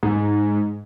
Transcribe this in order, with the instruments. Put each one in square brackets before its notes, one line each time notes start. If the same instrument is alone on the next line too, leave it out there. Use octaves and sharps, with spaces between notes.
[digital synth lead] G#2